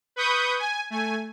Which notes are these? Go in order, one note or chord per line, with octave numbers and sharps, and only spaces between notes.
B4 B5 C#6 D#6 G6
G#5
A3 G#5